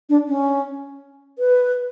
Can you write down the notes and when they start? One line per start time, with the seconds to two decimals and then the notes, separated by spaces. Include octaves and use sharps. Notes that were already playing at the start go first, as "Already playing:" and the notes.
0.09 D4
0.28 C#4
1.39 B4